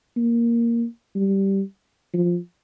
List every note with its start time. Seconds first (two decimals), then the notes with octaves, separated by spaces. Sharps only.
0.17 A#3
1.15 G3
2.14 F3